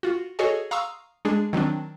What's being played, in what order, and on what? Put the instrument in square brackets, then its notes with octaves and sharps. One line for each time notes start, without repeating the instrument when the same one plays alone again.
[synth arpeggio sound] F4 F#4
F#4 G#4 A4 C#5 D#5 G#5
F5 A#5 C6 C#6 D#6 E6
G#3 D4 G#4
D#3 F#3 C4 D4